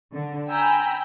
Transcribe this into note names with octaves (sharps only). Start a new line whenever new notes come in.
D3
G5 G#5 A#5 B5 E6 G6